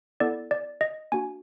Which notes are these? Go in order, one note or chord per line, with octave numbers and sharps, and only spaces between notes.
B3 E4 A4 D5
D5
D#5
A#3 D4 F#4 G#5